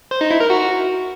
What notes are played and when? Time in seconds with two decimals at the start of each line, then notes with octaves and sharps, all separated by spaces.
0.11 C5
0.21 D#4
0.31 E4
0.40 A#4
0.50 F#4